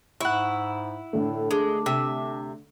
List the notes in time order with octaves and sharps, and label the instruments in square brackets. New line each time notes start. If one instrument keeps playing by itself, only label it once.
[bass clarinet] G#2 [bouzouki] E4 [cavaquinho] F#5 C#6
[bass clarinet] A2 [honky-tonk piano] D3 A3
[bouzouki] G#3 [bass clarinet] D4
[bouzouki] C3 [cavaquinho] E5